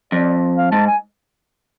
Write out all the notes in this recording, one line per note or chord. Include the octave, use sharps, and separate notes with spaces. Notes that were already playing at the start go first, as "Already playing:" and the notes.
F2 D5
F5
G#2 A5
G#5